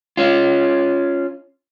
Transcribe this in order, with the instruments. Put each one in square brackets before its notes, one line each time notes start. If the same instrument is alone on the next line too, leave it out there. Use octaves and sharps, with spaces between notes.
[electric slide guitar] C#4 F4